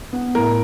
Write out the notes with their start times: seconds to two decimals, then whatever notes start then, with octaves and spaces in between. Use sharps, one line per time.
0.13 B3
0.35 A2 A#4